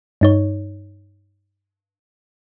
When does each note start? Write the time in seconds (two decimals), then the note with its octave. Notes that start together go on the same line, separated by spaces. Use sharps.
0.21 G2 D#4 C#5